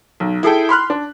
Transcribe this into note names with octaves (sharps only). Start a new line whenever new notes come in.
B1
E4 G#4 A4 G5
B5 C6 F6 F#6
D4